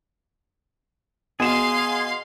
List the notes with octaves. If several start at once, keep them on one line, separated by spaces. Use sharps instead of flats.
B2 G#4 F5 C6 E7